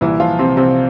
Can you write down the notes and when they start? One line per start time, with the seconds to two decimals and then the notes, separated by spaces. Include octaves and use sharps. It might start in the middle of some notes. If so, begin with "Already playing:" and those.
0.01 C2 A#2 E3 E4
0.20 F3 F4
0.39 C3 C4
0.57 C3 C4